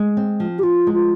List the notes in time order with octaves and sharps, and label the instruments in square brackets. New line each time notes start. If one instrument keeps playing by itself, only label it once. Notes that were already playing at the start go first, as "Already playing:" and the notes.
Already playing: [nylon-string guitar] G#3
C4
F3
[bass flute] G4
[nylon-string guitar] F3 [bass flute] F4
[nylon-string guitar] G#3
[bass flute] F4